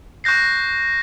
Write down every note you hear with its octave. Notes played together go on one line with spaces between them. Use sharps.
C#6 F#6 G6 A#6 C7